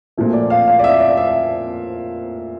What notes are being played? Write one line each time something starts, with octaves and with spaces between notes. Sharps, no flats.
A#2 F3 A3
D5
F5
F5
D5
E5
D5
E5